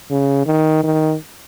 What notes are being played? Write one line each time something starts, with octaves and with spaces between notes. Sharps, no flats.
C#3
D#3
D#3